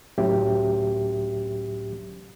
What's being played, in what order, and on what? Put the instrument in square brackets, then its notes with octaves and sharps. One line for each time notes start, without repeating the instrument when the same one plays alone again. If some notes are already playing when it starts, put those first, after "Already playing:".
[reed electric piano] C#2 A2 F#3 C#4 G4 E5